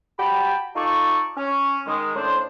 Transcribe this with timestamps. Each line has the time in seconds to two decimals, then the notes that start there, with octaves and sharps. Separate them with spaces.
0.19 F#4 G4 G5 A5 B5
0.76 D#4 F4 A4 D5 C#6
1.37 C#4
1.87 D#3 G#3
2.16 A2 C#4 D4 C5